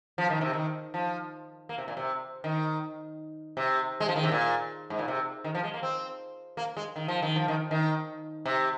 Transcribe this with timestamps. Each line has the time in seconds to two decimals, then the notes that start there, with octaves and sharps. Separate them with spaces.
0.18 F3
0.30 D#3
0.41 C3
0.53 D#3
0.94 F3
1.69 A#3
1.78 C3
1.88 A#2
1.97 C3
2.44 D#3
3.57 C3
4.00 G#3
4.08 F3
4.16 D#3
4.23 C3
4.31 A#2
4.90 G#2
4.99 A#2
5.08 C3
5.44 D#3
5.55 F3
5.63 G#3
5.74 A#3
5.83 C4
6.57 A#3
6.77 G#3
6.96 D#3
7.08 F3
7.22 D#3
7.36 F3
7.48 D#3
7.71 D#3
8.45 C3